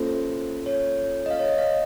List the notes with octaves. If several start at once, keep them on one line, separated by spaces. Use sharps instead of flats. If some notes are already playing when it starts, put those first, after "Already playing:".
Already playing: A#3 C#4 F4 A4 C5
C#5
D#5
F5
C#5
D#5
F5
D#5